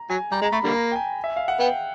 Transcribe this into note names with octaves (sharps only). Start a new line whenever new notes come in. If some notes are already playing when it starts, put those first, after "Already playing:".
Already playing: A#5
F#3 G#5
G3 A#5
G#3
A#5
A3 B5
D3 G3 A#3
A#5
G5
G#5
E5
F5
F#5
B3 G5